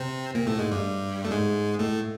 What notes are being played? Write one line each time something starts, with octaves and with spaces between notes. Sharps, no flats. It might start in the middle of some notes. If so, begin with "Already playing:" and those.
Already playing: C3 C4
A#2 A#3
A2 A3
G#2 G#3
G2 G3
A3
G#2 G#3
A2 A3